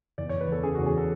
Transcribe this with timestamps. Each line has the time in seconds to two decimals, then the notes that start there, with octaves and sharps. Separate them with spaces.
0.18 E2 D5
0.29 E2 C#5
0.41 B4
0.48 E2 A4
0.63 C#3 G#4
0.75 E2 F#4
0.86 G#4
0.97 A4